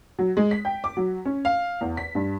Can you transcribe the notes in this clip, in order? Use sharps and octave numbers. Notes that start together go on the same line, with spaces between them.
F#3
G#3
B6
G5
D6
F#3
C#4
F5
E2
B6
G2